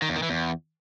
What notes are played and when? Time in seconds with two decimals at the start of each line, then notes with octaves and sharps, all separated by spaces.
0.02 D#3
0.09 E2
0.16 D#3
0.23 E3
0.30 E2